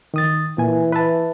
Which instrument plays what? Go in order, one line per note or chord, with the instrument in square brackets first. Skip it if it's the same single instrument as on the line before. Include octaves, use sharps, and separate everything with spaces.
[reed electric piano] D#3 D#6 A6
[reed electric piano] A#2 G#5 [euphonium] E3
[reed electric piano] B4 E5 A5